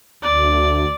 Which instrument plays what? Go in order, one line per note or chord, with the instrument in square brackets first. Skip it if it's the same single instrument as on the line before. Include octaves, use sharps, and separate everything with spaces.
[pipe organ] D2 [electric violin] D5